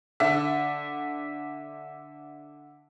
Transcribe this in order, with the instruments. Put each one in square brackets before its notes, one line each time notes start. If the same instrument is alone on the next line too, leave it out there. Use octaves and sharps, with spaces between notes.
[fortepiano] D3 [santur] E5